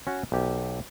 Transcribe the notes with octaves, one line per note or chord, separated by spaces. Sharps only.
C#4 F#4
B1 G4